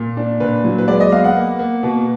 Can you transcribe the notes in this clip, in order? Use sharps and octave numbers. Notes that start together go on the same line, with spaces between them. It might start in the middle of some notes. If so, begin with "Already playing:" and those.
Already playing: A#2
D4
A#2 B4
F#3
B4
G#3 D5
D#5
B3 F5
F#5
A#3
A#3
B2